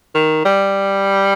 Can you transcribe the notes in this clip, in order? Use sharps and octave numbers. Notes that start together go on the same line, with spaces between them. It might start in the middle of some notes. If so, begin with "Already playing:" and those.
D#3
G3